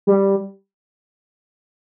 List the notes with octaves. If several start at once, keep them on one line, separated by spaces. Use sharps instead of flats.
G3